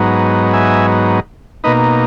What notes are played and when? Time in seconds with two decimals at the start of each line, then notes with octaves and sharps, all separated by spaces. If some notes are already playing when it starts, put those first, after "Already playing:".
Already playing: G#2 F#3 B3 D#4
0.53 E5 G#5
1.64 B2 A#3 D#4 B4 D#5